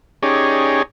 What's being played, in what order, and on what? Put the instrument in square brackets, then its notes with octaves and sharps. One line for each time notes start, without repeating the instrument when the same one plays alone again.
[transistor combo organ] C#4 D#4 G4 G#4 C#5 D5